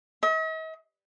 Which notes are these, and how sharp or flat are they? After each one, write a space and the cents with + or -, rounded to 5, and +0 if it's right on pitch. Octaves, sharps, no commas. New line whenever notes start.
D#5 +45